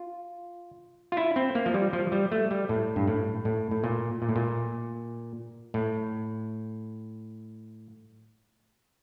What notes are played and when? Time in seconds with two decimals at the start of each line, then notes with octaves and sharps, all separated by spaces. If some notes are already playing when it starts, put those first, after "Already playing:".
Already playing: F4
1.12 F4
1.17 E4
1.36 C4
1.55 A#3
1.66 F3
1.74 G3
1.93 F3
2.12 G3
2.32 A3
2.51 G3
2.69 A2
2.96 G2
3.07 A2
3.45 A2
3.71 A2
3.84 A#2
4.22 A#2
4.29 A2
4.36 A#2
5.74 A2